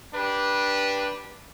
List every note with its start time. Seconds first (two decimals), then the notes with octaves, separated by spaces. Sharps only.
0.14 D4 G4 B4